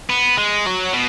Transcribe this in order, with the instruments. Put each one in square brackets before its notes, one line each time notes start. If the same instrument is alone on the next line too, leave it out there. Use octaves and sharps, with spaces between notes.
[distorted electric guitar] B3
G#3
F#3
B2